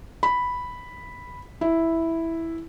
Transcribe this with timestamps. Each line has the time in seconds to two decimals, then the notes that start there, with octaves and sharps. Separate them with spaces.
0.23 B5
1.61 E4